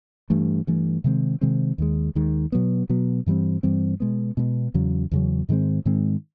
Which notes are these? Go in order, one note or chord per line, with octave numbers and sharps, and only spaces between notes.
G2 E3 A3
G2 E3 A3
C3 D#3 G#3 C4
C3 D#3 G#3 C4
D#2 D#3 G#3
D#2 D#3 G#3
B2 F#3 B3
B2 F#3 B3
G2 E3 G3 C4
G2 E3 G3 C4
B2 G#3 B3
B2 G#3 B3
E2 C#3 F#3
E2 C#3 F#3
G#2 D#3 G#3 C4
G#2 D#3 G#3 C4